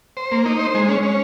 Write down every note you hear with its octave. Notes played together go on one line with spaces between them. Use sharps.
C5
A#3
D#4
C5
G#3
C#4
C#4